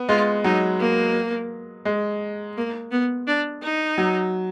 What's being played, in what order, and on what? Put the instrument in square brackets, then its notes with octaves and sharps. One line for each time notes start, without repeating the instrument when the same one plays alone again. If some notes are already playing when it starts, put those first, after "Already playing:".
Already playing: [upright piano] B3
[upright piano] G#3 [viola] F4
[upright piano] F#3 [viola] D#4
[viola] A#3
[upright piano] G#3
[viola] A#3
B3
D4
D#4
[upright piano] F#3